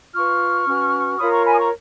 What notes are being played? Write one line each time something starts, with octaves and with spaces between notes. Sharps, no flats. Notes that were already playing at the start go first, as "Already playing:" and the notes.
F4 B4 C#6 F6
C#4 F#4 B4
F4 A#4 C#5 B5 D#6
A#5 C#6
G#5 B5
D#6
A#5 C#6